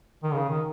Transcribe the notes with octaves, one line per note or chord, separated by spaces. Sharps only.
D#3
C#3
D#3